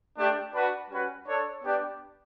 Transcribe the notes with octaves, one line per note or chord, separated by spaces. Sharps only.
A3 D4 G4
D4 F#4 B4
G3 C#4 F#4 B4
D4 A4 C#5
B3 D4 G4 D5